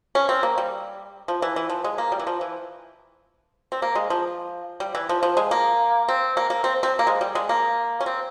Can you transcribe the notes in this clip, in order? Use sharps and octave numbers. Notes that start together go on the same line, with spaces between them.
C#4
C4
A#3
G3
F3
E3
E3
F3
G#3
A#3
G3
E3
F3
E3
C4
A#3
G#3
F3
G3
E3
F3
F3
G#3
A#3
C4
A#3
A#3
C4
C4
A#3
G#3
G3
G#3
A#3
C#4
C4